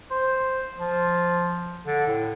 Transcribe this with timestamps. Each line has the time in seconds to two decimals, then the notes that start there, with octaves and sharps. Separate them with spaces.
0.11 C5
0.80 F3
1.86 D3
2.07 A2